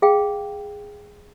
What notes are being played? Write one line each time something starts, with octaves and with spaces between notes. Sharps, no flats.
G#4 F5 G5